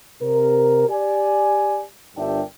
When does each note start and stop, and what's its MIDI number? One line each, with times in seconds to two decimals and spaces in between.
0.21 0.85 48
0.21 0.85 70
0.88 1.81 67
0.88 1.81 74
0.88 1.81 80
2.17 2.40 31
2.17 2.40 43
2.17 2.40 62
2.17 2.40 70
2.17 2.40 76
2.17 2.40 79